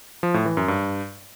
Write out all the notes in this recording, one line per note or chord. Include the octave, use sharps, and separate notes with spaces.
F3
A2
E3
F#2
G2